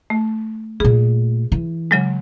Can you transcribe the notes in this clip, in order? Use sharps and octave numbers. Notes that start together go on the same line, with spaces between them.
A3
A#2 A3 G#4
E3
C#3 F#3 G#3